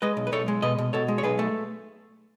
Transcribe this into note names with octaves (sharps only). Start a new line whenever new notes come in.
G#3 B4 D#5
B1
B4
B1 A4 C#5
G#3
B2 B4 D#5
B2
B2 A4 C#5
G#3
C#5
B1 G#4 B4
A3